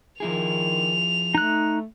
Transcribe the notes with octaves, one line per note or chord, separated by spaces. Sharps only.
D#3 F3 E4 G#4 F7
A3 D#4 F#6